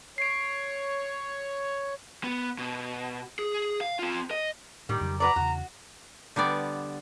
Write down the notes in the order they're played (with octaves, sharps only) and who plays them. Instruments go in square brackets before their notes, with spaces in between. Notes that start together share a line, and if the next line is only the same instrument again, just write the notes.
[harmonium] C#5 [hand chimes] C7 D7
[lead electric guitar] B3
B2
G#4
F5
C4 F4
D#5
[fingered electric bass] A2 [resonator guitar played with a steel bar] D#3 G3
[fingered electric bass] F2 C#3 F#3
[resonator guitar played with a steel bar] F#4 B4 D5 [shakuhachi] A#5
[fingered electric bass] E2 C#3 [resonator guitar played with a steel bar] F#4
[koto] D3 G3 B3 D5